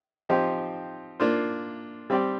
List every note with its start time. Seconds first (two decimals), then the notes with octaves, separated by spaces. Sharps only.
0.29 F3 C4 D#4 G4
1.20 A#3 D4 F4 C5
2.10 G3 C4 G4 D5